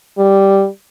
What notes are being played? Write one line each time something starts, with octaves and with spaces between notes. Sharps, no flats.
G3